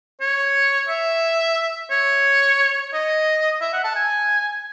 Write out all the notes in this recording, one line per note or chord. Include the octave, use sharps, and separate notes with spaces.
C#5
E5
C#5
D#5
E5
F#5
A5
G#5